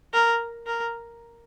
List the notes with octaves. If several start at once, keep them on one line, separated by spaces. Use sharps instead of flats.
A#4
A#4